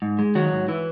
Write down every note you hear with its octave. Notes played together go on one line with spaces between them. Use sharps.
G#2
G#3
D#3 F#3 F#4
G#2
E3 E4